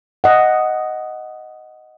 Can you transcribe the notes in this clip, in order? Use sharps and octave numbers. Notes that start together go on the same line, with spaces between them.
D#5 F#5